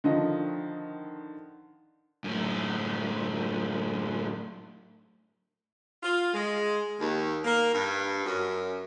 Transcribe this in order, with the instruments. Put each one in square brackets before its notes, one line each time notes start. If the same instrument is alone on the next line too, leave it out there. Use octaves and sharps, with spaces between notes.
[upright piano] D3 D#3 F3 D#5
[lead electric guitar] F#2 A2
[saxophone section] F4
G#3
D#2
A#3
G2
F#2